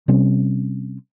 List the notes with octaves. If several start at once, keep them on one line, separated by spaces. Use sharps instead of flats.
C3 G3 C4 C#4